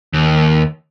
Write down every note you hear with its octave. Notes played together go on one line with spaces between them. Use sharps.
D#2